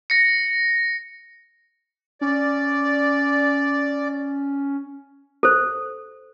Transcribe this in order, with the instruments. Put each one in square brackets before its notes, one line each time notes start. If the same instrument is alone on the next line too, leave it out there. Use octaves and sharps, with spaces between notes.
[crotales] A#6 C#7
[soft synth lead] C#4 [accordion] D5
[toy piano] A4 C5